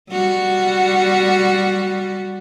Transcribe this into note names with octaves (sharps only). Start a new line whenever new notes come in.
G3 F#4